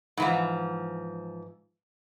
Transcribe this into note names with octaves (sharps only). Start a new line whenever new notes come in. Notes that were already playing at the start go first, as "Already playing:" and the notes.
G#2 E3 F3